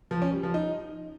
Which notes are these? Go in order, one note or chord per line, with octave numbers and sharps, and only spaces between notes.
F3
C#4
G3
F3
D#4